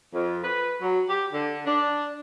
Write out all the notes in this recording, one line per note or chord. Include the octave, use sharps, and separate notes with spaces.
F2
B4
F#3
G4
D3
D4